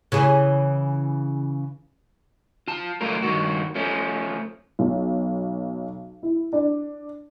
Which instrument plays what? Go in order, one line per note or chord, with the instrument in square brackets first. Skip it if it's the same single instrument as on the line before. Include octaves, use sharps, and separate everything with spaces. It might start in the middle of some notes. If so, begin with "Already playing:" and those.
[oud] C#3 E3 G#4
[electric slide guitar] F4 A5
F#2 A3 F4 A#4
G2 D#3 F#4
F3 A3 C#4
[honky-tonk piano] B1
E4
D4